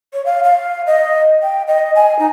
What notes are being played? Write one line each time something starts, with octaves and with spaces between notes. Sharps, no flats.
C#5
F5
F5
D#5
G5
D#5
G#5
D#4